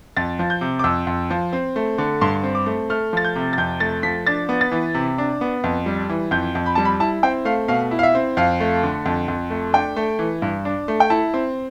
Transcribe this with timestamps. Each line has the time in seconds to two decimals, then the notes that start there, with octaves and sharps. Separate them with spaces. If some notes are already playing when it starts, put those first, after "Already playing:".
0.17 F2 A6
0.39 F3
0.50 G6
0.61 C3
0.79 D6
0.84 F2 E6
1.07 F2
1.30 F3
1.53 C4
1.76 A3
1.98 D3
2.21 G2 C6
2.43 C4
2.55 D6
2.66 A3
2.90 A3 F6
3.13 F3 A6
3.24 G6
3.35 C3
3.53 A6
3.58 F2 G6
3.80 A3 A6
4.03 F3 B6
4.27 D4 A6
4.49 B3
4.61 A6
4.72 E3
4.94 C3
5.18 D4
5.41 B3
5.64 F2
5.86 G3
6.09 E3
6.31 F2 G6
6.55 F2
6.66 B5
6.75 G3 A5
6.85 B5
7.00 E4 A5
7.23 C4 G5
7.45 A3 F5
7.68 B2 F5
7.91 E4
7.99 F5
8.03 E5
8.15 C4
8.37 F2 F5
8.60 A3
8.83 D3
9.06 F2
9.28 F2
9.50 A3
9.73 D4 G5
9.96 A3
10.19 E3
10.42 G2
10.65 D4
10.88 A3
11.00 G5
11.10 E4 A5
11.34 C4